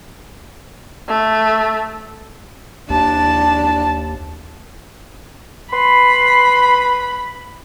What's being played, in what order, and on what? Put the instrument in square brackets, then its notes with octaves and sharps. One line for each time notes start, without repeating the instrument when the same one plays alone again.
[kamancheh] A3
[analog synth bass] D#2 [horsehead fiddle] D4 A5
[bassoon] B4 [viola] B5 [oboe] C6